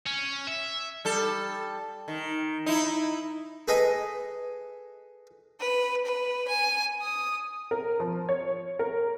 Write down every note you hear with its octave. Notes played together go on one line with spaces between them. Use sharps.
C#4
E5
G3 A4
D#3
D#4 E4
G#4 A4 B4 D#5 G#5
B4
B4
G#5
D#6
A#4
F3
C#5
A#4